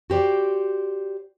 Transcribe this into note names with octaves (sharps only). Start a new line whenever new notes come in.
F#4 G4 C5 D5